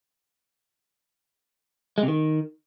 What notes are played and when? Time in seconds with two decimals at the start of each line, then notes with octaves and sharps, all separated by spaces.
1.98 G#3
2.03 C3
2.08 D#3